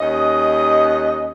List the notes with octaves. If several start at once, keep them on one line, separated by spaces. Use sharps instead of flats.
D#2 C#4 D#5